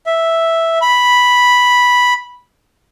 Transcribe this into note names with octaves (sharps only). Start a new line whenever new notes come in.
E5
B5